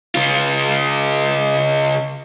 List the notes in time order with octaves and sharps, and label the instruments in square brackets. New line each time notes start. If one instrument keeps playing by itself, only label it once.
[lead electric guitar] C#3 F4